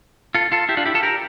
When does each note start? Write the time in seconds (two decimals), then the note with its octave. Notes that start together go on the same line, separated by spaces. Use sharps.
0.35 F4 A4
0.52 F4 A4
0.69 E4 G4
0.77 D4 F4
0.85 E4 G4
0.94 F4 A4
1.02 G4 A#4